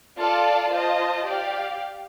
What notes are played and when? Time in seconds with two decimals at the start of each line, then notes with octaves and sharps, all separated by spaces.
0.18 F4 A4 D5 F5 A5
0.71 F4 C5 D#5 A5
1.25 G4 D5 F5